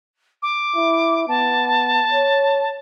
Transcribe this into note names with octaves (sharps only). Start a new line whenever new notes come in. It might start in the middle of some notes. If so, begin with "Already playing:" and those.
D6
E4
B3 A5
C#5